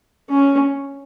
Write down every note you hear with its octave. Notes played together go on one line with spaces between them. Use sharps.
C#4